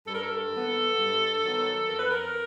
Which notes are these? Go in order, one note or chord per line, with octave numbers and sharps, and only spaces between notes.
G2 A4
A#4
A4
D#3 F#3 B3
G2
D#3 F#3 B3
F2 A#4
B4
A#4